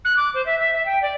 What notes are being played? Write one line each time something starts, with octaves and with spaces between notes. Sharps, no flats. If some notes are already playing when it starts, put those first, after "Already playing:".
F#6
D6
C5
E5
E5
E5
G5
D5